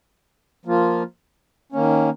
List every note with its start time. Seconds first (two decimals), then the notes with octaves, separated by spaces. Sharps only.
0.65 F3 A#3 F4
1.72 D#3 A#3 C#4